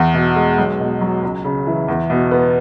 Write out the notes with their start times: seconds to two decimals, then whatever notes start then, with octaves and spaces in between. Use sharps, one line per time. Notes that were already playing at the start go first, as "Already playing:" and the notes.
Already playing: E2
0.14 B2
0.36 G#3
0.58 B1
0.80 B2
1.01 F#3
1.23 C#2
1.44 C#3
1.67 E3
1.88 E2
2.10 B2
2.31 B3